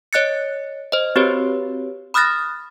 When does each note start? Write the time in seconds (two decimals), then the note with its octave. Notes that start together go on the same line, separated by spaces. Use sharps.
0.13 C#5 D#5 F#6 A6 C#7
0.92 C5 D#5
1.16 C4 F#4 G4 B4 C#5
2.14 B5 D#6 F6 F#6 A6 A#6